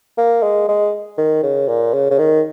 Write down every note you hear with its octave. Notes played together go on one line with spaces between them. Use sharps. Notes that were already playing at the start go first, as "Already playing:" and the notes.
A#3
G#3
G#3
D#3
C#3
A#2
C#3
C#3
D#3